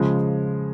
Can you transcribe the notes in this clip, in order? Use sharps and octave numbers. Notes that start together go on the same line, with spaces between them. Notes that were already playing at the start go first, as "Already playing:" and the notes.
Already playing: C#3 F3 G#3